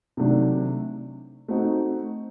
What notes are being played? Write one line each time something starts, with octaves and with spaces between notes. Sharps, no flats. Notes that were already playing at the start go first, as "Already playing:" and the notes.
C3 D#3 F#3 A3 D4
A3 C4 D#4 F#4